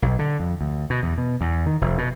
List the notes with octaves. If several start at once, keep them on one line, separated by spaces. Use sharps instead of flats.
B1
D3
F2
D2
B2
E2
B2
E2
D#3
F1
B2